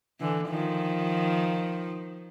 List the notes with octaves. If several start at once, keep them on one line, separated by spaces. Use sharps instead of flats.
D3 E3
D#3 F3